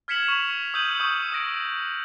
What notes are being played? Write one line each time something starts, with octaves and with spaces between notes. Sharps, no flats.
F6 G#6 B6 C#7 E7 F#7
C#6 F7
D#6 E6 G6 D#7 F#7
C#6 D#6
D#6 F#6 A#6 D7